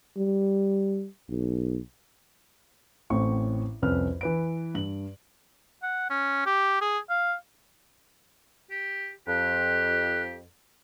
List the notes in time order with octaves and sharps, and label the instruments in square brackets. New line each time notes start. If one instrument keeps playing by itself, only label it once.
[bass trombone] G3
B1
[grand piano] A1 A2 C4 C#6
C2 F2 C#4 B4 F6
E3 B4 D7
G2 F#7
[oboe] F#5
C#4
G4
G#4
F5
G4
[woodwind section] F2 [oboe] G4 [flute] F#6